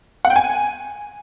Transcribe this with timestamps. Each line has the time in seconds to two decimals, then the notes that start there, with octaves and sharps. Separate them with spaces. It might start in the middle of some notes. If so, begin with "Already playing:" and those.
0.25 F#5
0.30 G5
0.36 G#5